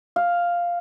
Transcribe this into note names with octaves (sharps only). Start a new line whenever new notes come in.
F5